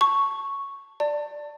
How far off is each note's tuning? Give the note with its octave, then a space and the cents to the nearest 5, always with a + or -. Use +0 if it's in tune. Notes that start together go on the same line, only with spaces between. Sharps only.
A5 +15 C#6 +0
D5 +0 A5 +30